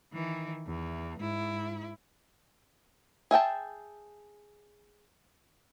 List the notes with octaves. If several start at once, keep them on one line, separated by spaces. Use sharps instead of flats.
D#3 E3
E2
G#2 E4
G#4 E5 G5 A5